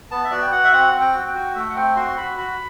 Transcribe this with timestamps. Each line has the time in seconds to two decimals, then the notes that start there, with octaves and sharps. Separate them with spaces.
0.11 B3 A5
0.24 E5
0.31 F#4 D5
0.42 G5
0.51 F#4 F#5
0.64 E5
0.72 C4 F#5
0.93 C4
1.01 G5
1.14 F#4
1.28 G5
1.34 F#4
1.55 A3 E5
1.70 F#5
1.75 C4 G5
1.96 F#4 C6
2.17 F#4 B5
2.37 F#4 B5